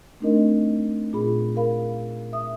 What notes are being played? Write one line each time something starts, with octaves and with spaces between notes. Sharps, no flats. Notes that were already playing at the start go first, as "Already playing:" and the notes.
A3 C4 D4 D#4 A#4 D#5
A#2 F4 G#4 B5
A#4 F5 B5
E5 D#6